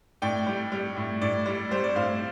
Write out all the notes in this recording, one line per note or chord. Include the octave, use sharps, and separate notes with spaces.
A2 D5 G5
G3
G3
A2
A2 D5
G3
G3 C5
D5
A2 C5 F5